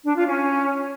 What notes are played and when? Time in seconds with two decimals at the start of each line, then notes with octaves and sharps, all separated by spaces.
0.04 D4
0.16 F4
0.27 C#4